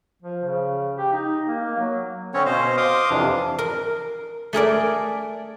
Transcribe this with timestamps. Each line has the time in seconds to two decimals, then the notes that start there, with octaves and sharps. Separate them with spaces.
0.22 F3
0.43 C#3
0.98 G4
1.13 D#4
1.47 A#3
1.63 A#3
1.78 F#3
2.34 D3 C4 C#4 C#5
2.46 B2 C5 D#5 F5
2.77 F5 C6 D6 D#6
3.10 F2 C3 E3 D4
3.59 A#4
4.53 A3 G#4 A#4 D5